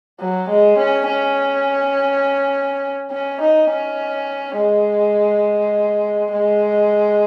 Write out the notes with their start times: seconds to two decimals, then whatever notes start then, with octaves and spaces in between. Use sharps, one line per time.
0.20 F#3
0.49 G#3
0.78 C#4
1.07 C#4
3.11 C#4
3.41 D#4
3.71 C#4
4.57 G#3
6.33 G#3